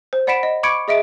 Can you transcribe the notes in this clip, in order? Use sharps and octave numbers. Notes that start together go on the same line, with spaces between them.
C5
D5 F#5 B5 B6 D7 E7
D#5
B5 C#6 D6 G#6 C#7 D7
G#4 D#5 E5 D7